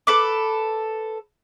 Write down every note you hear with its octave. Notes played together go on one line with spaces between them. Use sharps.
A4 B4 D6